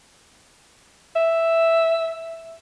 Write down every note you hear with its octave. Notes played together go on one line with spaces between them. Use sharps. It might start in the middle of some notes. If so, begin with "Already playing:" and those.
E5